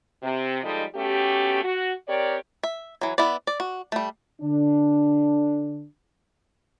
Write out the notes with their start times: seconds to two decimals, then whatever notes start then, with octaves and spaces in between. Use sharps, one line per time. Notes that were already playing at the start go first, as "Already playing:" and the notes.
0.22 C3
0.63 F3 G3 G#3 D#4 A4 D#5
0.95 B2 A3 C#4 G4
1.64 F#4
2.08 C4 G4 A#4 C#5 D5
2.63 E5
3.01 E3 F#3
3.18 B3 E4 D5
3.47 D5
3.60 F#4
3.92 G3 A3
4.42 D3 D4